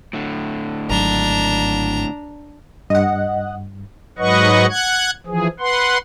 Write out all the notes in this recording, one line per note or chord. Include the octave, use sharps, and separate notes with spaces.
A2 D3
G#1 F#3 D4 A#5
G2 D#5 F#5
G#2 F#3 B4 D#5 F#5 C#6
F#5 F#6 G#6
E3 F3 G#4
B4 F#5 C6